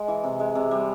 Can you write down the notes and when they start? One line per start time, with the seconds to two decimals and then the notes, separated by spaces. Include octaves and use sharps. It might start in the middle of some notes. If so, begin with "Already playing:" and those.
Already playing: G#3 G#5
0.08 E3
0.24 C3
0.40 G#3
0.55 C3
0.71 G3